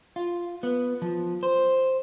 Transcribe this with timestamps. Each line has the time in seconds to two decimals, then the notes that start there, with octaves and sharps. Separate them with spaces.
0.16 F4
0.63 B3
1.02 F3
1.43 C5